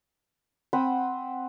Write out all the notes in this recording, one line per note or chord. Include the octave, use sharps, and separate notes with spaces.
C4 F#5 B5 D#6